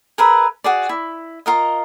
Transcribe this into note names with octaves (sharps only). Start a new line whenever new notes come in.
G#4 A#4 B4 E5
F#4 G#4 D5
E4
F4 A#4 D#5